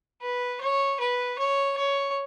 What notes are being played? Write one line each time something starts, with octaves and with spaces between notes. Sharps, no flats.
B4
C#5
B4
C#5
C#5